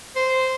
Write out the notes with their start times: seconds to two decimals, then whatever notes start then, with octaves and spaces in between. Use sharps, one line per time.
0.16 C5